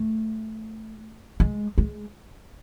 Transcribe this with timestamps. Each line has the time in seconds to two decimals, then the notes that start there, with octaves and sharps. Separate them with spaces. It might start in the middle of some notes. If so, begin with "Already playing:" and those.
Already playing: A3
1.40 G#3
1.78 G#3